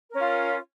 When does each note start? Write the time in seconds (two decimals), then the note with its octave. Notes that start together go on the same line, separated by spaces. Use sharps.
0.10 A#4
0.14 C#4
0.18 F4